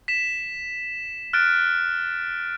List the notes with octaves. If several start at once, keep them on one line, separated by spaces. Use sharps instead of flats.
B6 E7
F6 F#6 A6 D7